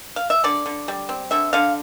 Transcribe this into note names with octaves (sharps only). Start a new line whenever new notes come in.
F5
E5
D3 D5
D3
G3
C4
D3 E5
D3 F5